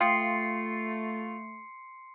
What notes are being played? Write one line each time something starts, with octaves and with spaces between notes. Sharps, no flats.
A3 F4 F5 G5 C6 D#6 C7 C#7